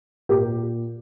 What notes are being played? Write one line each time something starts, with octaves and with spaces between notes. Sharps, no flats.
A#2 G4 A#4